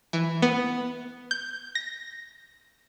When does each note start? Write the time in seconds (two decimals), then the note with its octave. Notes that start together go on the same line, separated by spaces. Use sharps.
0.13 E3
0.42 B3
1.31 G6
1.75 A#6